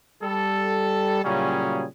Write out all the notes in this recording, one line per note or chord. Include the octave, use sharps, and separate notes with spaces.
G3 A4
A#2 C#3 F#3 G3 C#4 G#4